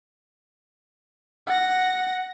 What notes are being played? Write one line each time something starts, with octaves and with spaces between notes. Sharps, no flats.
F#5 A#6